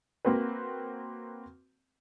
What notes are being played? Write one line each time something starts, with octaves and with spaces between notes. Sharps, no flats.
A#3 C4 F#4 B4